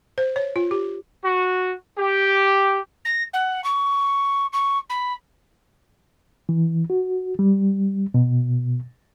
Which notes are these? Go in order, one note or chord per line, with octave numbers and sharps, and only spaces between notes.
C5
C#5
F4
G4
F#4
G4
A#6
F#5
C#6
C#6
B5
E3
F#4
G3
B2